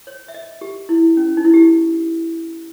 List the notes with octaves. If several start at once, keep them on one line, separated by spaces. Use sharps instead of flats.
C#5
E5
D#5
G4
E4
C#4
C#4
D#4
E4
G4